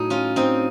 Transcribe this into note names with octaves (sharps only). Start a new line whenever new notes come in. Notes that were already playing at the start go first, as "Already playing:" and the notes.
Already playing: A2 F#3 D#4
C#4 F4
C4 D#4